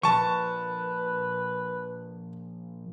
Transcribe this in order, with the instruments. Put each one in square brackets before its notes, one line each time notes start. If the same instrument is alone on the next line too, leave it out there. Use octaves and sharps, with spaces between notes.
[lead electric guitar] A#2 F3 [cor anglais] B4 [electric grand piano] A5 C#6